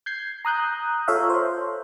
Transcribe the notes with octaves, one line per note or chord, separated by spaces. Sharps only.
G6 G#6 C7
A#5 D#6 F#6 G6
F4 A4 C#5 E5 F5
C5